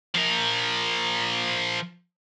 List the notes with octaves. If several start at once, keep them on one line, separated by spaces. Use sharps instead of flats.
F3 A#4